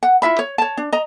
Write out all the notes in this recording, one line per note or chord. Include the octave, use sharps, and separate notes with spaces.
F#5
E4 F4 E5 B5
C#5
C#5 A5
D4
D#5 A#5